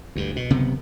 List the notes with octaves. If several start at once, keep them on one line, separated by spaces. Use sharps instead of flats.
D2 G2
B2
F#1 C3 D#3 B3